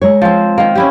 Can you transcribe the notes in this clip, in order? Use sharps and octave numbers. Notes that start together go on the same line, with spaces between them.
G#3 A#4 C#5
F3 C4
D#3 A#3
C#4 E4 G4